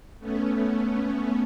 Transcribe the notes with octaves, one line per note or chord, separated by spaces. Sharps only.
A3 B3 C#4